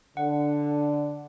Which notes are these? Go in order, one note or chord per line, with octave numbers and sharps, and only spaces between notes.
D3 F#5